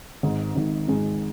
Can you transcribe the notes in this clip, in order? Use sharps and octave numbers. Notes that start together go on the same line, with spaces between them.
G#1 G#2 D#3 G#3
G#1 G#2 D#3 G#3
G#1 G#2 D#3 G#3